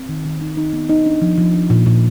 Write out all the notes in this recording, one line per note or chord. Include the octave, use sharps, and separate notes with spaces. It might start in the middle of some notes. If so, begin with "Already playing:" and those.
Already playing: C4
D#3
D#3
D#4
D#4
B3
D#4
D4
F3
F3
D4
A#2
A#2